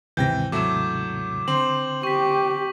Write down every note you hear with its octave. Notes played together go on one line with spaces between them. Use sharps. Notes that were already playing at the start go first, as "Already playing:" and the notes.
D#2 G#2 C3 E3 G5 G6 A#6
F#3 A3 E4 D6 E7
D3 C4 C6 F#7
G4 C#6 B6